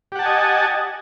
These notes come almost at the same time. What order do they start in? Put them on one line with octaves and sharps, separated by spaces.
G4 F#5 A5 G#5 D#5